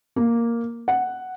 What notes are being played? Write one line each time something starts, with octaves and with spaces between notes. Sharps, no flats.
A#3
F#5